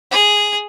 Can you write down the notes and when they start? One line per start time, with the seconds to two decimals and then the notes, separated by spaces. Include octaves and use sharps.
0.11 G#4